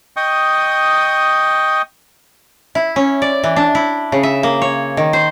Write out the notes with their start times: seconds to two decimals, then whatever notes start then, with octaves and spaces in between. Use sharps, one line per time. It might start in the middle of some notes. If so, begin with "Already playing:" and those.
0.17 D#5 G5 C#6 D#6
2.75 E4
2.96 C#4
3.22 D5
3.44 E3
3.56 D4
3.75 E4
4.12 C#3
4.23 E5
4.43 A#3
4.62 C#5
4.97 D#3
5.13 C5